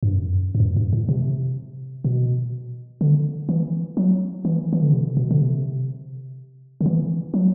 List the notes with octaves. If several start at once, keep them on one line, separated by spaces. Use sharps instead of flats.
G2
F#2
G2
F#2
G2
A2
C3
B2
D3
E3
F#3
E3
E3
D3
C3
B2
D3
C3
D3
E3
F#3